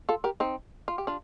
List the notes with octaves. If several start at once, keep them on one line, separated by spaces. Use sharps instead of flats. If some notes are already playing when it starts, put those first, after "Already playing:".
F4 A4
G4 A#4
C4 D#4
F4
G4
D4 F4